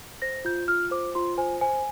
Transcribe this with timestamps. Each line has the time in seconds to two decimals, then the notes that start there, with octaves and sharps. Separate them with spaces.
0.22 C5 A#6
0.45 F4 G6
0.68 F4 F6
0.91 C5 D6
1.15 F4 C6
1.38 C5 G#5
1.61 C5 G#5